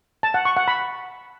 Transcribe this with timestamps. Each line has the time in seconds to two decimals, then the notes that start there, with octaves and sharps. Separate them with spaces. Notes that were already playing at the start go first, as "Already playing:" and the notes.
0.23 A5
0.34 F#5
0.45 C#6
0.56 F#5
0.68 B5